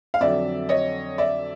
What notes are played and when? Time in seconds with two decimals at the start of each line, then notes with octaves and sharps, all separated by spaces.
0.14 F5
0.20 F2 D3 F#3 D5 E5
0.69 C#5 D#5
1.18 D5 E5